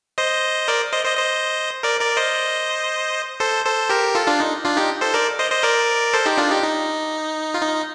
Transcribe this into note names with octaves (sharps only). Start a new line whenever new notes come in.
C5 D#5
A#4 D5
C5 D#5
C5 D#5
C5 D#5
A#4 D5
A#4 D5
C5 D#5
A4 C5
A4 C5
G4 A#4
F4 A4
D4 F4
D#4
D4 F4
D#4 G4
A4 C5
A#4 D5
C5 D#5
C5 D#5
A#4 D5
A4 C5
D#4 G4
D4 F4
D#4 G4
D#4
F4
D#4